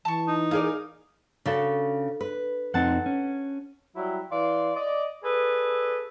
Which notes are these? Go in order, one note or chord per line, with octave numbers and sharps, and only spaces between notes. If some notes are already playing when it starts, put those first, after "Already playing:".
E3 A5 C#6
D#4
A#3 G#4 D5 F5
C#3 D4 F#4 A4
B4
F2 C4 D#4 F#5 A5
C#4
F#3 G3 E4
E3 D5 F5 C6
D5 D#5
G#4 A4 B4 D5